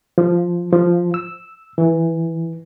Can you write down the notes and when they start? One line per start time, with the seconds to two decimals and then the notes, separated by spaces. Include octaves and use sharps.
0.18 F3
0.73 F3
1.14 E6
1.78 E3